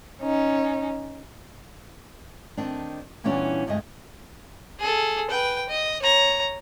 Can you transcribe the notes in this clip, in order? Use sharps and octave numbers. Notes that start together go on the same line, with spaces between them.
C#4 D#4
D#3 C4 D4
A#2 E3 G3 B3 C#4 D4
D2 G2 G3 G#3 D#5
G#4 A4
B4 G5
D#5
C#5 A#5